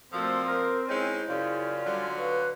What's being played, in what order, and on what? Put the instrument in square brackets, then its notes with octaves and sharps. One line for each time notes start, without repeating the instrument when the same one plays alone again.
[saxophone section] A#2 F3 [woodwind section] A3 F#4 A4 [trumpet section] C4
[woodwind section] A#4
[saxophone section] G#3 C#4 D#4 [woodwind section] E4 C5 G5 [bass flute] C#5
[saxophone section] F#2 C#3 [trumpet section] C#4 F4 [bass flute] D5
[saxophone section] D3 F#3 [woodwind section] G3
[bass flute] B4 [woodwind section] F5 C#6